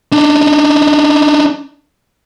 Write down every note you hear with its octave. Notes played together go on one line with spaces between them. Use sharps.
D4 D#4